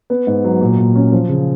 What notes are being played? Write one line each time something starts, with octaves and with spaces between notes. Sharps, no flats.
B3
G#2
F#3
A#2
A#2
C#4
F3
C#3